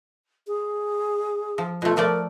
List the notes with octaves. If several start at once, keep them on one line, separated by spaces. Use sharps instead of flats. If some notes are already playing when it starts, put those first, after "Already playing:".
G#4
F3
B2 A3 F4
F3 A3 A#4 D5